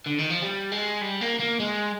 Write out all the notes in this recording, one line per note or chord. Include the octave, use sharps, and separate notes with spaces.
D3
D#3
F3
G3
G#3
G3
A#3
A#3
G#3